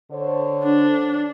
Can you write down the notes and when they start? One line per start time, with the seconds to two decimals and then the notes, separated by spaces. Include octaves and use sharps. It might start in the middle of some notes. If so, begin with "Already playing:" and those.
0.11 D3 C5 C#5
0.63 D4